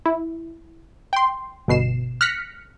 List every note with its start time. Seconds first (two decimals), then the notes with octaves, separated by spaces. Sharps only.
0.06 E4
1.13 G5 C6
1.68 G1 B2 C7 E7
2.21 F6 F#6 A#6 B6 C#7